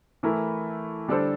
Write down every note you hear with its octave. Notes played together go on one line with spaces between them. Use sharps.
E3 A3 E4 A#4
D3 G3 D4 A4 C5